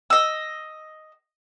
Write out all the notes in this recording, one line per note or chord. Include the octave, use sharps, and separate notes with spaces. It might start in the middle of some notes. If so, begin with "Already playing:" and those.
D#5 E6